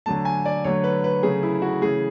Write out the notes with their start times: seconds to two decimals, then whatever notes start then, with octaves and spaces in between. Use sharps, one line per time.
0.06 D3 F#3 A3 A5
0.25 G#5
0.46 D5
0.64 D3 F#3 A3 C#5
0.84 B4
1.04 B4
1.23 C#3 F#3 A3 G#4
1.43 E4
1.62 F#4
1.82 C#3 E3 A3 G#4